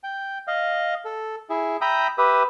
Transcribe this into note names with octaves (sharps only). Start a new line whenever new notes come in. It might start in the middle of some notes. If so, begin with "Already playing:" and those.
G5
D#5 F5
A4
E4 G#4
E5 G5 A#5 B5 D#6
G4 B4 E5 D#6